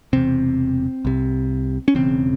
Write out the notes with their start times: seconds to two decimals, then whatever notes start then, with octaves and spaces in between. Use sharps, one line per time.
0.13 E1 E2 C3 C4
1.05 C2 C3
1.88 C#4
1.95 E1 E2 C#3 C4